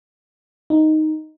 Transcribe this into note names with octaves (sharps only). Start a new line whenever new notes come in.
D#4